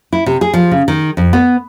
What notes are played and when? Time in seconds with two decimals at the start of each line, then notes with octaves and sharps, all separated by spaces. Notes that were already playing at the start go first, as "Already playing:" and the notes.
0.13 E4
0.26 C3
0.41 G#4
0.54 F3
0.71 C#3
0.88 D#3
1.17 F2
1.33 B3